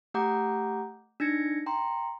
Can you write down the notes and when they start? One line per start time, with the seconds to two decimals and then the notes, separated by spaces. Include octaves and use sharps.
0.14 A3 G4 F#5 A#5 D6 G6
1.20 D4 D#4 G#6 A#6 C#7
1.66 G5 A#5 C6